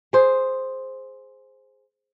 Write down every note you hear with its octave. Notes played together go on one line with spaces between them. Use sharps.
G#4 C5